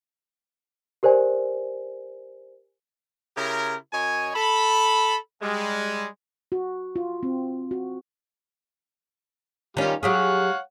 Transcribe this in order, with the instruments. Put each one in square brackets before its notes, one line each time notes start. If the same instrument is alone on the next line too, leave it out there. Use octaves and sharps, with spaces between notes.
[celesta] G4 A#4 C5 D5 G#5
[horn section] C#3 E4 G4 A#4
F#2 C#5 D#5 G#5
A4 B5
G3 G#3
[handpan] F#4
F4
C4
F#4
[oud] D#3 C#4 [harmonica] G3 F4
[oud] F#3 G4 G#4 [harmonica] C#5 F5 F#5